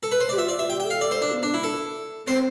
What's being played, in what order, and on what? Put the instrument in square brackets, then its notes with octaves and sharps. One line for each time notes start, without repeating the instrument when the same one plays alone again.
[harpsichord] A4
B4
C5
[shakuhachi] G4 [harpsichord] D5
[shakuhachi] F4 [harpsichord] E5
[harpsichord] D5
E5
[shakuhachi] G4 [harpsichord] G5
[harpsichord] G5
[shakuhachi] A4
[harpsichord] F5
D5
C5
D4
[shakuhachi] B3
[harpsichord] D4
E4
A4
[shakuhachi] C4 [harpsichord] C5